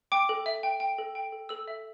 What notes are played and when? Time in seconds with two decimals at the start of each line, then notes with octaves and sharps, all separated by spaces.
0.12 G5 D6
0.29 A4
0.46 E5
0.63 G5
0.80 G5
0.98 A4
1.15 G5
1.32 A4
1.49 A4 E6
1.68 E5